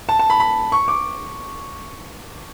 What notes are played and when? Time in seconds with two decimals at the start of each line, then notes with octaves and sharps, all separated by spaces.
0.09 A5
0.19 A5
0.30 B5
0.40 B5
0.72 C#6
0.88 D6